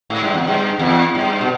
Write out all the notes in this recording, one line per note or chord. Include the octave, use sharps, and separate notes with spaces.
G#2
G2
E2
G2
E2
G2
B2